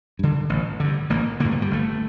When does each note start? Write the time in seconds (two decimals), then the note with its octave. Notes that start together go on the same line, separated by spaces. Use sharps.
0.19 G2 D3
0.49 A1
0.80 G2 D3
1.10 A1 A#3
1.40 G2 D3 A#3
1.51 A3
1.62 G3
1.71 G1 A3